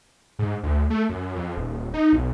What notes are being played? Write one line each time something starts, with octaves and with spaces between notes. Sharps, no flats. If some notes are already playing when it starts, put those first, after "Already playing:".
G#2
D2
A3
F#2
F2
D#1
D#4
B1